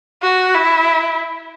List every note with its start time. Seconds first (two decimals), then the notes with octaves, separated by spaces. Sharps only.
0.22 F#4
0.55 E4